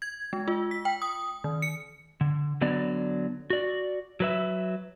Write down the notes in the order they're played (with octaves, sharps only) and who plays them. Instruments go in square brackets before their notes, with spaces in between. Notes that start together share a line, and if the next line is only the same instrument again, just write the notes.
[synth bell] G#6
G#3
F4
B6
G5
D#6
D#3
C#7
[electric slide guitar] D3
D3 F#3 B3 D5
F#4 D5
F#3 B4 E5